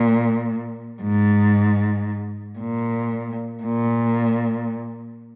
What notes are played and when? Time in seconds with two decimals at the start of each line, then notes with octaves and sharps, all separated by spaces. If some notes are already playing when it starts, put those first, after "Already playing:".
Already playing: A#2
1.03 G#2
2.59 A#2
3.63 A#2